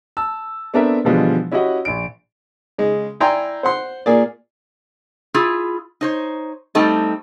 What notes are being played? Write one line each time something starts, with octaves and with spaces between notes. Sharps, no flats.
A5 E6
B3 C4 D4 A4 A#4 E5
B2 D3 E3 F3 G3 G#3
C#4 E4 F#4 G4 D#5 F#5
A#1 D7
C#3 G#3
E4 D5 G5 G#5 A#5 C6
C5 F#5 C6
A#2 A#3 G#4 D5
E4 F4 G#4
D#4 C5 C#5
G3 A3 C4 D#4 A4